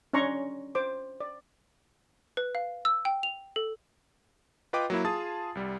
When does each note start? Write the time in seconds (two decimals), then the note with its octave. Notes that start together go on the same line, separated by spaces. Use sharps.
0.13 C#4 D4 C#5 A#5 C6 C#6
0.75 C5 D6
1.20 D5
2.37 B4
2.55 F5
2.85 E6
3.05 G5
3.23 F7
3.56 A4
4.73 F4 B4 D#5 G5 D6
4.90 F#3 A#3 E4
5.05 F4 G#4 A5 D#6 A6
5.55 C2 G3